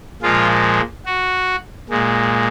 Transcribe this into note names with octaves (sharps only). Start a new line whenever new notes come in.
A#2 F3 G#3 F4
F#4
A#2 G#3